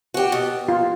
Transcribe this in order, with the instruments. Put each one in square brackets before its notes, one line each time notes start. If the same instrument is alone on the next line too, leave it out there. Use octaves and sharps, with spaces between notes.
[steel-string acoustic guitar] F#4 G4
B2
[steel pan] F4